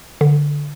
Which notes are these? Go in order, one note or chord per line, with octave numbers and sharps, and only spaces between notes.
D3